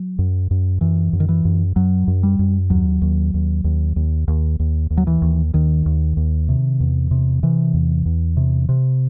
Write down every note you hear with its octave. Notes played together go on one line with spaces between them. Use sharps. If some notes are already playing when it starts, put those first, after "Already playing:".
Already playing: F#3
F#2
F#2
F#2 E3
F#2
D#3
E3
F#2
F#2 F#3
F#2
G3
F#2
D#2 F#3
D#2
D#2
D#2
D#2
D#2
D#2
D#2
F#3
E3
D#2
D#2 D#3
D#2
D#2
C3
E2
C3
C3 E3
E2
E2
C3
C3